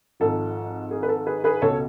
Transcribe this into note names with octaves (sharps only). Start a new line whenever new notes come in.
G#1 G#2 F3 A4
G#4
B4
A4
G#4 B4
G#4 B4
C#2 B2 A4 C#5